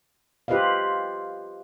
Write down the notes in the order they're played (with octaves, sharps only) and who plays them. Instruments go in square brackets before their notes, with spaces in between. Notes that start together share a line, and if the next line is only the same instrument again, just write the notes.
[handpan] F4 G4 B4 C5 D#5 F5